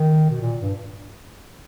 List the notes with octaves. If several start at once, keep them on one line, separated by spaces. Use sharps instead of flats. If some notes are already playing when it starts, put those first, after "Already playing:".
Already playing: D#3
B2
A#2
G2